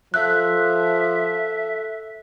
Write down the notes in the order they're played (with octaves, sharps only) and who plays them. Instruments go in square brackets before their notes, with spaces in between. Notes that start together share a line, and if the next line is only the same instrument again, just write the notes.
[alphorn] F3 [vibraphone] A4 E6 [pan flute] E5 [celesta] F#6